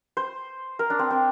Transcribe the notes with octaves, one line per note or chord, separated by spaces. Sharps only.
C5
A#4
D4
C4
C4